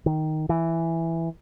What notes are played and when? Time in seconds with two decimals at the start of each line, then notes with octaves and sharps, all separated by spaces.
0.06 D#3
0.49 E3